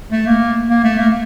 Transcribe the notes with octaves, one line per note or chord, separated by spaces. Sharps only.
A3
A#3
A#3
A3
A#3